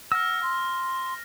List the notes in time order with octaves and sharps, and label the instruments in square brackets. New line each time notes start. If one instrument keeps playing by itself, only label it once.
[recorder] F#5 [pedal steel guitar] E6 [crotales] F6 A#6
[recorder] C6